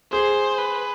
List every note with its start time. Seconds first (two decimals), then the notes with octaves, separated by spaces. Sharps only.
0.12 G#4 C5
0.58 B4